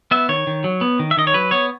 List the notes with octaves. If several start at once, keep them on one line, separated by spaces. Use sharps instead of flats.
B3 E5
D#3 C#5
D#3
F#3
B3
D#3
E5
D#3 D#5
C#5
F#3 B4
B3 C#5